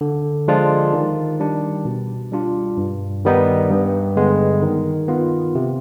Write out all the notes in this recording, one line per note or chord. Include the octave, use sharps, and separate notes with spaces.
D3
F3 G#3 D4 F4
D#3
G3 D4
B2
G3 D4 F4
G2
D#3 G3 B3 D#4
G2
D3 G#3 B3
D#3
B3 F4
C3